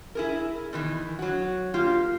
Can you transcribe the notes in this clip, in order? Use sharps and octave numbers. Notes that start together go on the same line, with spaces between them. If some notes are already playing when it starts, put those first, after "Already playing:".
E4 G#4 A#4
B2 D#3 E3
F#3 F#4
A#3 F4 G4